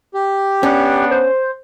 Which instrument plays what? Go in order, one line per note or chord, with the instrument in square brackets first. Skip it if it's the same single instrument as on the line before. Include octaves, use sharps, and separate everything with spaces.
[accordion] G4
[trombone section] B3 D4 [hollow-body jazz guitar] C#4
[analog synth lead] C5